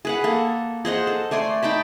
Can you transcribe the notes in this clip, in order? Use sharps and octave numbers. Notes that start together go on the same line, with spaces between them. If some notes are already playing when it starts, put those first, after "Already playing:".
G#4 B4 F#5
A#3 A4
G#4 C5 D#5 F#5
A4
A3 D5 G#5 C6
D#4 G5 A5 B5